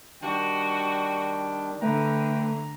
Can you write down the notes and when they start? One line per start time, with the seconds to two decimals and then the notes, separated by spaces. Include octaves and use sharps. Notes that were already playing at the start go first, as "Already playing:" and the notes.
0.22 D#3 G3 D4 F#4 G5
1.82 D3 A3 B4 G5 A#5